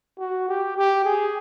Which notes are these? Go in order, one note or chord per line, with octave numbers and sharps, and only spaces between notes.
F#4
G4
G4
G#4